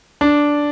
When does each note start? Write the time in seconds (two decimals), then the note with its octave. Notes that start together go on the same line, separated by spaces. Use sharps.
0.21 D4